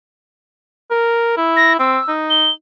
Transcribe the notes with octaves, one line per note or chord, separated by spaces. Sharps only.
A#4
E4
A#6
C4 E6
D#4
G7